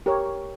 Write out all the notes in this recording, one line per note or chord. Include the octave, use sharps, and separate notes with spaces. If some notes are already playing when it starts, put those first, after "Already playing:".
G4 A#4 C#5